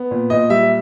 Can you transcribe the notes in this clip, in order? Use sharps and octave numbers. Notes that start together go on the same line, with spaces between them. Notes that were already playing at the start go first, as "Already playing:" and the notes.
Already playing: B3
A#2
A#2 D#5
G3 E5